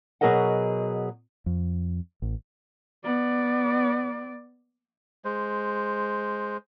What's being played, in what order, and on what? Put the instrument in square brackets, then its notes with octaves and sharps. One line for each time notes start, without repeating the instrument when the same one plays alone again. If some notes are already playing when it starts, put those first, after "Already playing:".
[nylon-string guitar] B2 F#3 G#4 A#4 D#5 F#5
[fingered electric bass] F2
A1
[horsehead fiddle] B3 D5
[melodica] G#3 C5